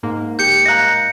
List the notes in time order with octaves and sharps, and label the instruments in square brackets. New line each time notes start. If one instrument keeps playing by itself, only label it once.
[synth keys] G#2 A#3
[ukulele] G4 [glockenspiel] G6 C#7
[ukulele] D#5 F5 A#5 [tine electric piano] F#6 A#6